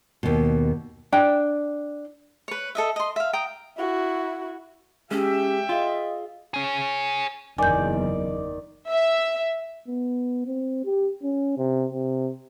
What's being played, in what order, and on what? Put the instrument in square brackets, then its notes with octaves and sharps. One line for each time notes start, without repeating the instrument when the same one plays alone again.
[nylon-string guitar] D#2 B2
[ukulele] D4 G5
[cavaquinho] B4 C#5
A4 D#5 E5
D#5 C6
E5 F5
G5 A#5 D#6
[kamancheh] E4 F#4
[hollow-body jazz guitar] G#3 [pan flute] C#4 [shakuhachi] G4 [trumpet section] E5 G5
[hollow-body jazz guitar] F4 [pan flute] G#4 [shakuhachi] D#5
[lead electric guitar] G#4 C#5
[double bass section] F#1 E2 [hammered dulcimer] D#3 D5 [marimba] G#5 G6
[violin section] E5
[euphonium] B3
C4
G4
C#4
C3
C3